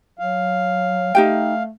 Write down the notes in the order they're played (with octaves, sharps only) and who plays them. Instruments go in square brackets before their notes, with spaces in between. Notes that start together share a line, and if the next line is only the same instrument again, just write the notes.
[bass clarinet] F#3 [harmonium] F5
[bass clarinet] A3 [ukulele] D#4 G4 G5